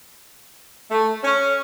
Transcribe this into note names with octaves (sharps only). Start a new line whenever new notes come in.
A3
C#4